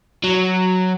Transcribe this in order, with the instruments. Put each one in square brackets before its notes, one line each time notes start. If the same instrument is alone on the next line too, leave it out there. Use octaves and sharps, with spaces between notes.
[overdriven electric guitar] F#3